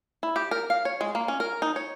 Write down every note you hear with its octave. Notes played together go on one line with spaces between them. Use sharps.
E4
G4
A#4
F5
C#5
G#3
A#3
C#4
A#4
D#4
C#5